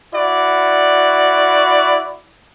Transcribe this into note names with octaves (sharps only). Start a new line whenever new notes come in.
E4 F#4 D5